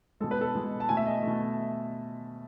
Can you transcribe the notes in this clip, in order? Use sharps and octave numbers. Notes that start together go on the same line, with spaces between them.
B2 G#3 A4
B4
A4
B2 G#3
A5
B2 A3 G#5
E5
D#5
B2 A3